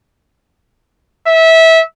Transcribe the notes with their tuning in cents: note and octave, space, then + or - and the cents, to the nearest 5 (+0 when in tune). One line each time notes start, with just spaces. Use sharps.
E5 -20